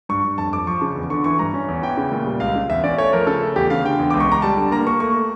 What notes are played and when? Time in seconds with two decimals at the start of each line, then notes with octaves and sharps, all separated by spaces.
0.09 G2 C#6
0.24 G2
0.38 F2 A5
0.53 F2 D6
0.67 F3 C#6
0.82 C#3
0.96 E2
1.10 D3 C#6
1.24 E3 C#6
1.39 G2 A#5
1.54 C#4
1.68 E2
1.82 E3 G5
1.97 C#3
2.12 A#2
2.26 G3
2.40 C#2 F5
2.55 C#3
2.69 E2 E5
2.84 C#4 D5
2.98 A3 C#5
3.13 F3 A#4
3.27 C#3 A4
3.42 A3
3.56 E2 G4
3.70 C#3 F5
3.84 D3 G5
3.99 E2
4.10 C#2 D6
4.20 C#6
4.28 C#2 A#5
4.42 G3 A5
4.57 D3
4.72 A#3 A#5
4.87 A#3 C#6
5.00 A3 C#6
5.14 A3